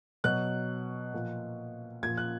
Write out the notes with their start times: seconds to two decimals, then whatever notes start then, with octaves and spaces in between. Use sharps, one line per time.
0.24 B2 F#3 F#6
1.14 A#2 F3
2.03 A#2 F3 G#6
2.18 F#6